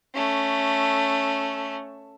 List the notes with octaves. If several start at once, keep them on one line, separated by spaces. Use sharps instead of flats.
A3 C#4